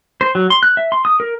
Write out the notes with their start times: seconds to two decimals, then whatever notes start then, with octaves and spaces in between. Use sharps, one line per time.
0.21 C5
0.35 F#3
0.50 C6
0.63 F#6
0.77 E5
0.92 C6
1.05 D#6
1.20 A#4